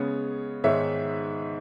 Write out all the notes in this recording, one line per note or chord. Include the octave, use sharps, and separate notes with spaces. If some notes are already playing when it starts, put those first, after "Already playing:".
Already playing: C#3 G#3 B3 C#5
G#2 D#3 G#3 B3 C#5 E5